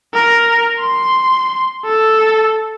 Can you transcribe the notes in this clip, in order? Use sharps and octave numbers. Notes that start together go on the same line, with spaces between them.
A#4
C6
A4